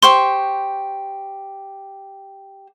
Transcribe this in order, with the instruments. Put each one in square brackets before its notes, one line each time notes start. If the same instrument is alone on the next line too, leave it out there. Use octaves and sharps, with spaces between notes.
[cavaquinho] G4 C5 C#6 [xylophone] C6